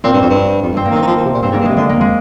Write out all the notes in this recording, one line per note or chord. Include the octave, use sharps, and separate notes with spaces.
A#2 C4
G2
F2
G2
F2
G2 C4
A#3
D#3
C4
D#3
F3
D#3
C3
A#2
G2 C4
G#2 A#3
G2
C3 G#3
D3 G#3
A#3
F2
G#3